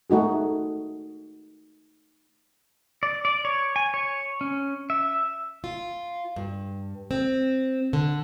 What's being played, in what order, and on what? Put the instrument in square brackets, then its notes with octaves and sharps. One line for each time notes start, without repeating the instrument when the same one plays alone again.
[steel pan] A3 D#4 F#4 G#4
[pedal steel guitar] D5
D5
C#5
G#5
C#5
C#4
E5
[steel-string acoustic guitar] F4
G2
C4
D3